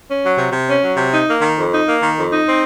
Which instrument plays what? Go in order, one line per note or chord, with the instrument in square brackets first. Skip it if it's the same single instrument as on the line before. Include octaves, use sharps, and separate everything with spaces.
[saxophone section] C#4
F#3
C3
C3
C#4
F#3
C3
D#4
A#3
D#3
F2
D#4
A#3
D#3
F2
D#4
C4